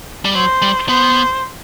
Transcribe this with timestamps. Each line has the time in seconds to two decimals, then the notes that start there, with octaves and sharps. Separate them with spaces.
0.25 G3
0.35 F#3 C5
0.62 G3
0.89 B3 C5